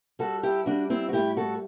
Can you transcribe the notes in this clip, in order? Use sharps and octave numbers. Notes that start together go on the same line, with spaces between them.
G3 F#4 A4
E4 G4
G3 D4 F#4
C4 E4
F#4
A2 E4 G4
F#4 A4